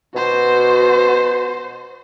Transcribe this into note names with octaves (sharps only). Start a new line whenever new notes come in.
B2 F#4 C5